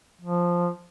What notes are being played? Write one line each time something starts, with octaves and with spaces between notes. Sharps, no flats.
F3